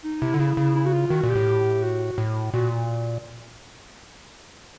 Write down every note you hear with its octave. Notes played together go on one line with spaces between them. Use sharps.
D#4
C3 E4
D3
C#3 E4
C#3
E4
F#4
F4
D#3 F#4
A#2
G4
A2
F#4
A2
A#2 F#4